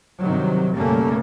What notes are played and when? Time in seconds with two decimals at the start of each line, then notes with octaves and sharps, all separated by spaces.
0.19 G2 C3 D#3 F3 F#3
0.75 F#1 B2 G3 A3 A#3 C#4